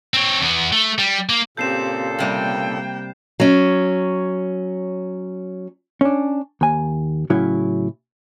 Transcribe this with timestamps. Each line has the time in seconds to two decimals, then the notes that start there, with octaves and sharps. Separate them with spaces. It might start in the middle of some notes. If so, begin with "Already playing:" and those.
0.14 C4 C#5
0.42 E2 B3
0.72 A3
0.98 G3
1.29 A#3
1.57 A#2 C#3 C4 G4 A4 G6 C7 E7
2.19 C3 G3 A#3 G5
3.40 F#3 C#4
6.01 C#4 D4
6.61 D#2 G#5
7.30 A2 C#3 F#3 C#4 E4